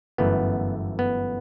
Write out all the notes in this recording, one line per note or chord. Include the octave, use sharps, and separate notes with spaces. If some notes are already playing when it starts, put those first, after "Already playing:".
G1 F#2 E3 A3 B3
B3